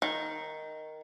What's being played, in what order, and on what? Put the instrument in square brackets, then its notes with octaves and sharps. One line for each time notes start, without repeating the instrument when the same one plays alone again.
[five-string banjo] D#3